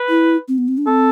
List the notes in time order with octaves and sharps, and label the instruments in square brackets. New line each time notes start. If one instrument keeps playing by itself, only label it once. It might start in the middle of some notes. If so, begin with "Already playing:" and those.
Already playing: [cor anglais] B4
[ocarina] E4
C4
B3
C4
D4
[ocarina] C4 [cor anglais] A4